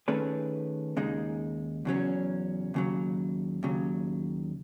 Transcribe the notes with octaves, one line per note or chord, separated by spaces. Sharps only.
D#3 A3 C#4 G#4 B4
D#2 C#3 G#3 D#4
E2 C#3 F#3 C#4
D#2 C#3 F#3
D#2 C#3 F#3